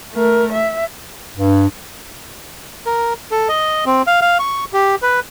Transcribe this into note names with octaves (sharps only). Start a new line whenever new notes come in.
A3 A#4
E5
G2
A#4
A4
D#5
C4
F5
F5
C#6
G4
B4